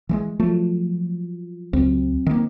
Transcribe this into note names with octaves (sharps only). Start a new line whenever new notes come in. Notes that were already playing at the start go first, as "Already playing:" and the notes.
E3 G3 G#3
F3 F#3 A3
C#2 F#3 C4
D#3 A#3